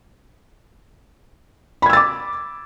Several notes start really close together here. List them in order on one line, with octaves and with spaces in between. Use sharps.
B5 G#6 E6 A6 D6